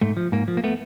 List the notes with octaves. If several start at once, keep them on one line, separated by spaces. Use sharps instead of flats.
G#2 A3
F3
G#2 A#3
F3
A#3
A3 B3